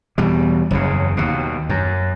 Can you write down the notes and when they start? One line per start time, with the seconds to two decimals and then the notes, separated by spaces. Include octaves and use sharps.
0.18 E2 B2 G3
0.71 F#1 E2 C#3
1.17 D#2 B2
1.69 F#2